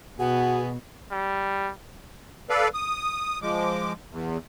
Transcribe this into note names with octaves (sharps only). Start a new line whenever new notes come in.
B2 B3 F#4 G#4 F#5
G3
A4 B4 D5 F5
D#6
F3 G#3 D6
E2